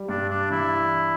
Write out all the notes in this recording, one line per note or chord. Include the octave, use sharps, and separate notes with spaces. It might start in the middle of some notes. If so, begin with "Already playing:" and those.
Already playing: G3
G2 D4
D4
E3 E4